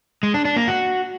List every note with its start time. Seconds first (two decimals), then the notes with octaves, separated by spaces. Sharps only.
0.23 G#3
0.34 D4
0.45 D4
0.56 A#3
0.67 F#4